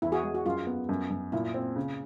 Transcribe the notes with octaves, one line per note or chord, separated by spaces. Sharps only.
E2 E4
F#4 G#4
G#3
F#4
F#2 F4
B3
F#2
F#2
A#2 E4
C4
C#3